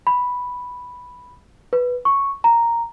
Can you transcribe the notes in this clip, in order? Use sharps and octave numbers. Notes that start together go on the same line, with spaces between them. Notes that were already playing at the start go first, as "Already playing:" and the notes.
B5
B4
C#6
A#5